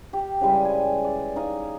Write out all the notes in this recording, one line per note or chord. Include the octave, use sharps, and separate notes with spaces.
G4
C#3 E3 G3 G#3
G#5
D5
D#4 D#5 F5 G#5